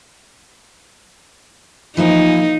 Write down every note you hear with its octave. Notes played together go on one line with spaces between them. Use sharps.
E3 F3 A#3 D#4